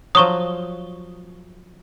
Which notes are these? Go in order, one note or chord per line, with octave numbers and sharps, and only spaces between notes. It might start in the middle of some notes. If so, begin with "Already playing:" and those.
F3 F#3 C#6 D#6